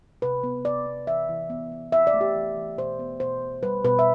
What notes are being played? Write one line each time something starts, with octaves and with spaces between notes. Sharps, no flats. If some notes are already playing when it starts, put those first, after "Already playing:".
C3 B4
B3
C3 D5
B3
E3 E5
E3
B3
B3
C4 E5
D5
A3
G4
E3
E3
B2 C5
B3
B2 C5
B3
G3 B4
B2 B4
E5